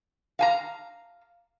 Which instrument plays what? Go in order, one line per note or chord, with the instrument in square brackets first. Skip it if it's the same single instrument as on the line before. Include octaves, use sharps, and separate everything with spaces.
[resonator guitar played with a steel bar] F5 G#5 A#5